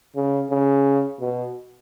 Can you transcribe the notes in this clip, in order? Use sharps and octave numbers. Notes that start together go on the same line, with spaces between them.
C#3
C#3
B2